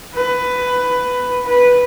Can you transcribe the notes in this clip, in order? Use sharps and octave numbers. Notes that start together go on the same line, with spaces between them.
B4
B4